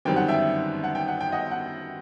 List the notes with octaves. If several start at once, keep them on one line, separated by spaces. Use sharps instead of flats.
G1 F#2 D#3 G3 C4 G5
F#5
E5 G5
F#5
G5
F#5
G5
D#5 F#5
F#5